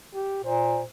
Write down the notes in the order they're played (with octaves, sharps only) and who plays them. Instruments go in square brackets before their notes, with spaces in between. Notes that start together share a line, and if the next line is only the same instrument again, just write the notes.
[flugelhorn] G4
[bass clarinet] A#2 [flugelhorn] C5